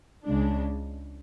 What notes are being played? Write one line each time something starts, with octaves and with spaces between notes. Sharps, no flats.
C#2 C#3 G#3 D4